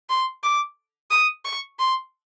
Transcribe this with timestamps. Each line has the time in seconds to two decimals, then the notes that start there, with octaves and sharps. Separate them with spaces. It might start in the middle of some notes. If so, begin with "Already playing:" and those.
0.09 C6
0.43 D6
1.11 D#6
1.45 C#6
1.79 C6